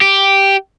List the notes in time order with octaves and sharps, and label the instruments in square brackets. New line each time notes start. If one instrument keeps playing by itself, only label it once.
[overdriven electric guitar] G4